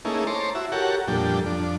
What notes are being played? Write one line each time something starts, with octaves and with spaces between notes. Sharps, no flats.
A3 A#3 C#4 D#4 E4 G#4
C5 C#5 A5 A#5 C6 D6
E4 F#4 E5
F#4 G4 A4 A#4 C#5 F#5
F2 A#2 G3 D4 A4 G5
F2 D4